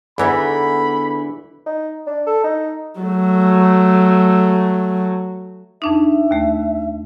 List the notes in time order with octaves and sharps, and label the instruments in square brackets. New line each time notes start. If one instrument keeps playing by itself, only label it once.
[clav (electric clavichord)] E2 E3 [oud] D3 B3 D#4 [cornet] B5
[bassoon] D#4
D4
A4
D#4
[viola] F#3 A3
[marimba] F2 D4 D#4 [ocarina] E5
[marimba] D#2 A3